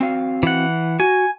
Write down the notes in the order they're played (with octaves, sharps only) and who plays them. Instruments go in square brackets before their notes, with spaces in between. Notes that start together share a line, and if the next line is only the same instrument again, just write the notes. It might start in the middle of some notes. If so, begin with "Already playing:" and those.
[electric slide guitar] C4 F#4 F5
[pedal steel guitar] E3 F#5
[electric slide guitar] F#4 [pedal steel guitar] G#5